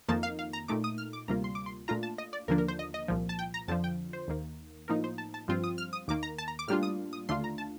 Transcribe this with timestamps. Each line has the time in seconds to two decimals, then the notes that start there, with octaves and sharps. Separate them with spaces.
0.09 F2 D#3 A#3 D#4 A5
0.23 F5
0.39 F5
0.53 A#5
0.68 A#2 A3 D#4 D6
0.84 D#6
0.98 F6
1.13 D6
1.28 D2 C3 G3 A#3 F4 A#5
1.44 C6
1.55 D6
1.66 C6
1.88 A#2 A3 D4 F4 A#5
2.03 A5
2.18 D#5
2.33 D5
2.48 D#2 D3 F3 A#3 D4 A#4
2.58 A#4
2.68 C5
2.79 D#5
2.94 D#5
3.08 C2 A#2 F3
3.29 A5
3.39 G5
3.54 A#5
3.68 F2 D3 F3 A5
3.84 G5
4.13 C5
4.28 D#2 D#3 A#3
4.88 A2 F3 A#3 D#4 A#4
5.04 C5
5.18 A5
5.34 A5
5.48 G2 F3 C4 F4
5.64 D#6
5.78 F6
5.93 D#6
6.08 D#2 D#3 A#3 D6
6.23 A#5
6.38 A5
6.48 A#5
6.59 D6
6.68 A2 G3 A#3 D4 F4 F6
6.83 D#6
7.13 D#6
7.29 D#2 D3 A3 D4 F4 C6
7.44 A#5
7.58 A5